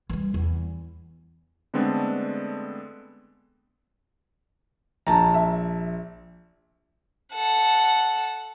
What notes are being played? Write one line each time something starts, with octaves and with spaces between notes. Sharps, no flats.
E3 G3
E2
D3 G#3 A3 B3 C4 D4
A#1 D4 A5 A#5
E5
A4 F#5